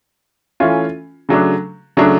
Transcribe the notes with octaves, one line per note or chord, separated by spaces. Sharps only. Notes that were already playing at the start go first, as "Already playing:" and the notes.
E3 A3 C#4 F4
C#3 F#3 A3 D4
C#3 F#3 A3 D4